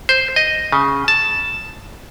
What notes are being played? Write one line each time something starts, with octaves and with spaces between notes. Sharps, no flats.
C5
D#5
C#3
A5